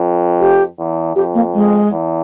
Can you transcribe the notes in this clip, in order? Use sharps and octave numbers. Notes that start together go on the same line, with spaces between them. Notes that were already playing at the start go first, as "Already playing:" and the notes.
Already playing: F2
G4
E2
F2 G4
A#3
G#3
E2